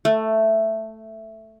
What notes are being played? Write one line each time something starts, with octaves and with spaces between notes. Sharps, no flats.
A3